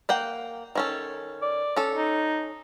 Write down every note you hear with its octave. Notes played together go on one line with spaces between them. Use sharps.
A#3 F#5 G5
D#3 C#4 A4
D5
C#4 A4
D#4